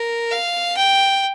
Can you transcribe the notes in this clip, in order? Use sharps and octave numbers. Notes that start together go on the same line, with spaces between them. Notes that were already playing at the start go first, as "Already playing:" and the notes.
Already playing: A#4
F5
G5